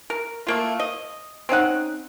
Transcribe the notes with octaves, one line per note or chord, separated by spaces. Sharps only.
A#4
A3 A#3 F4
D#5
C4 C#4 D#4 F#5